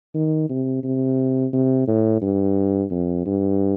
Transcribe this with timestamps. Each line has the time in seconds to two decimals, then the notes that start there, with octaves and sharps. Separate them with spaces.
0.14 D#3
0.49 C3
0.84 C3
1.53 C3
1.87 A2
2.22 G2
2.91 F2
3.26 G2